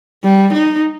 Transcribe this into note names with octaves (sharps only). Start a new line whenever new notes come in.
G3
D#4